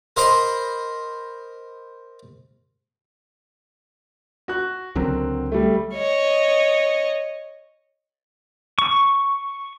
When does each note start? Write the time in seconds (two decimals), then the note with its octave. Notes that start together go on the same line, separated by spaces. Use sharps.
0.17 A#4 C5 D#5 B5 C6
4.48 F#4 F#6
4.95 C#2 D3 F#3 C4 A#4
5.52 G3 A3
5.95 C#5 D#5
8.79 C#6